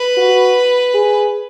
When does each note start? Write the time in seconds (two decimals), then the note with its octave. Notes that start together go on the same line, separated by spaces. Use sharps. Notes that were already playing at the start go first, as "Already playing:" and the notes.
Already playing: B4
0.17 F#4
0.95 G#4